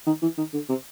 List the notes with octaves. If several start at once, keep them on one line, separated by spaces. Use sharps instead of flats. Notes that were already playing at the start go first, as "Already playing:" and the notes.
D#3
E3
D#3
D3
C3